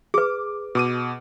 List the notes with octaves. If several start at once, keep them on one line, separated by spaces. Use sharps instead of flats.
G#4 B4 D6
B2 D6 D#7